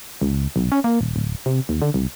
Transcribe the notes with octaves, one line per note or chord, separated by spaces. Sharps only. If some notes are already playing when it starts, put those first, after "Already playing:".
C#2
B1
C#4
A#3
D#1
D1
C3
D#2
D3
C2